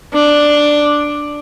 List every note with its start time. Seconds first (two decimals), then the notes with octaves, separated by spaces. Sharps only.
0.13 D4